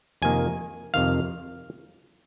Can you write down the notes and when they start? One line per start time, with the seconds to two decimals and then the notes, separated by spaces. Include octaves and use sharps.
0.22 F2 C3 D#3 A#3 G#5
0.94 F2 C3 D#3 F5